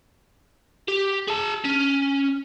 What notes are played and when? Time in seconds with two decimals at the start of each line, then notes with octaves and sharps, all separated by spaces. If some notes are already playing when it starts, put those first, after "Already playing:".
0.88 G4
1.28 G#4 A5
1.65 C#4